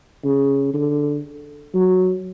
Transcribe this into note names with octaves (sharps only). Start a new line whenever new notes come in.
C#3
D3
F#3